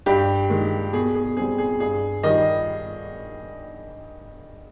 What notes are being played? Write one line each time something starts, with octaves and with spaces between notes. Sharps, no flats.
G2 G4
D#3 G#3
B2 G#4
G#4
G3 C4 G#4
G#4
G2 G#4
D#3 G3 D#5